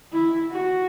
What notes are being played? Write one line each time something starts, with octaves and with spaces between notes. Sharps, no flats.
E4
F#4